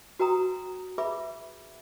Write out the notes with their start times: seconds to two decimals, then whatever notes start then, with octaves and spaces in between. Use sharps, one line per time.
0.19 F#4 B4 G5 A#5 D#6
0.98 G#4 B4 E5 B5 D6